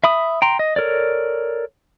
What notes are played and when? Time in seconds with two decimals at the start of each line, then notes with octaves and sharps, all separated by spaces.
0.04 E5 B5 D#6
0.42 G5 A#5 C6
0.59 D#5
0.76 A4 A#4 C#5 D5